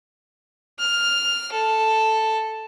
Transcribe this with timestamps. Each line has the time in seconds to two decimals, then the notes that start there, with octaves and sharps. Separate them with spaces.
0.79 F6
1.52 A4